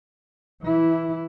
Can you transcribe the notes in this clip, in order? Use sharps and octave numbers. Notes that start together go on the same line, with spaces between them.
E3 E4